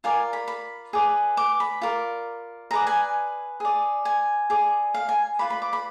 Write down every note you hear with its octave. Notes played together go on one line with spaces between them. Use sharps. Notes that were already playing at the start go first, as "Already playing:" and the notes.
F4 A#4 D5 G#5
B5
B5
G#4 B4 D5
D6
B5
F4 A#4 D5
G#4 B4 D5 A#5
G#5
G#4 D5
G#5
G#4 D5
F5
G#5
F4 B4 D5 B5
B5
D6
B5